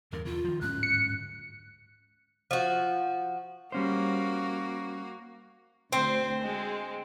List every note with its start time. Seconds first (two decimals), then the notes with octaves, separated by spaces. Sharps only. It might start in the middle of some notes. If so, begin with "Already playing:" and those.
0.12 E2 G2 D3 A#4
0.25 E2 B2 F4
0.44 D#3 F3
0.61 D1 G#2 C#4 F#6
0.83 C#7
2.51 F3 F#4
3.72 G3 A#3 C#4 F#4 C5
5.93 D2 C4 C5
6.41 G#3